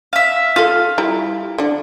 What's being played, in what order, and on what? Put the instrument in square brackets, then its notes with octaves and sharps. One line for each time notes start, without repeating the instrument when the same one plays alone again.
[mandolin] E5 F5
[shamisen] F4 A4 [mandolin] F5
[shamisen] G3 E4 A#5
D3 D4